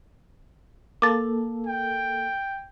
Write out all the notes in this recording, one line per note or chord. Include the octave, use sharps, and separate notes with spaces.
A#3 A4 D6 A6
G5